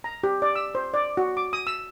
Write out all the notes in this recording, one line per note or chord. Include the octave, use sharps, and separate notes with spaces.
A#5
G4
D5
E6
C5
D5
F#4
D6
D#6
E6